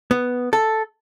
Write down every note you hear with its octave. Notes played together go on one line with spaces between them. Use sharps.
B3
A4